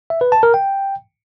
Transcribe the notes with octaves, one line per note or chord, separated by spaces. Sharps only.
E5
B4
A5
A#4
G5